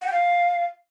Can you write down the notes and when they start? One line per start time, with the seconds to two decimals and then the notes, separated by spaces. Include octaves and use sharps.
0.02 F#5
0.07 G5
0.12 F5